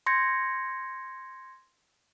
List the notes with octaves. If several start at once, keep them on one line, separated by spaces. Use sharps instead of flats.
C6 G6 G#6 A#6 C#7